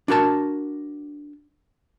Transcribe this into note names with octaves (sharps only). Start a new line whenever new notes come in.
D4 F#4 A#4 A5